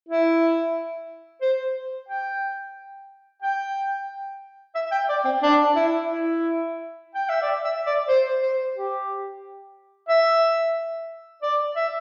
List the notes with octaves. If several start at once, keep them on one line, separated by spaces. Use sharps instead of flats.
E4
C5
G5
G5
E5
G5
D5
C4
D4
E4
E4
G5
E5
D5
E5
D5
C5
C5
G4
E5
D5
E5